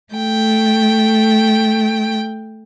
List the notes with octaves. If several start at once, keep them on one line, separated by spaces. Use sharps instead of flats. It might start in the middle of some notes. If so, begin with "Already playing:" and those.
A3 G5